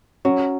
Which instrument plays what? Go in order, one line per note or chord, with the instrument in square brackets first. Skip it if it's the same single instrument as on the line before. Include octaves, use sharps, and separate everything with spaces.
[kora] F#3 [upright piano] C#4